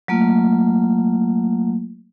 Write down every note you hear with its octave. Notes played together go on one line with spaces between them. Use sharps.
F#3 A3 A#3 F4